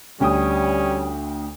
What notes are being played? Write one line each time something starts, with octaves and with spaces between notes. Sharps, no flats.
D2 G3 C#4 G5 D#6